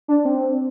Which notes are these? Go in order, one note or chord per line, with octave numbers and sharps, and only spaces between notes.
D4
C4